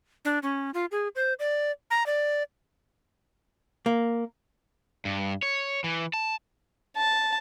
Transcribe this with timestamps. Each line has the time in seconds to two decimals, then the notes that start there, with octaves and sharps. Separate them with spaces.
0.25 D4
0.43 C#4
0.74 F4
0.91 G#4
1.15 C5
1.39 D5
1.91 A#5
2.06 D5
3.86 A#3
5.05 G2
5.43 C#5
5.84 E3
6.14 A5
6.97 A5